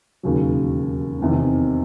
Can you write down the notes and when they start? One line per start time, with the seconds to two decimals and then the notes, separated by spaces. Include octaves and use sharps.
0.23 E1 D#2 C#3 F#3
1.19 F1 E2 C3 D#3